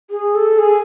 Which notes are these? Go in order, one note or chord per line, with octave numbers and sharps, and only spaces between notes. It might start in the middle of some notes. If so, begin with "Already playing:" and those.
G#4
A4
G#4